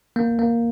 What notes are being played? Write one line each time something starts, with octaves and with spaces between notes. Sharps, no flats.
A#3
A#3